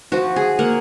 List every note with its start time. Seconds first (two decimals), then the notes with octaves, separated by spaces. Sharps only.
0.12 F3 F#4
0.36 G#4
0.59 A#3 F#5